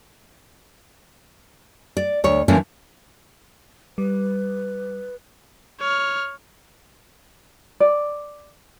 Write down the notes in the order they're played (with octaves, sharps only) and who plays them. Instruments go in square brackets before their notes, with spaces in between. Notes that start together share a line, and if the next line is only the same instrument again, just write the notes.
[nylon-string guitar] D5
D2 C#5
D3 E3 F3 A#3 C#4 F4
[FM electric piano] G3 [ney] B4
[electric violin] C#5 F6
[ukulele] D5